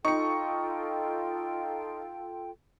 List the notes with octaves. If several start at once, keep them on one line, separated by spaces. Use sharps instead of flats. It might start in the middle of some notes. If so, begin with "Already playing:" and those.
D#4 F4 A4 G5 C#6 C#7